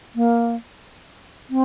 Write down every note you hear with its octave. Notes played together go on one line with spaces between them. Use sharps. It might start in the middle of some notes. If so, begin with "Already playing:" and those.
A#3
C4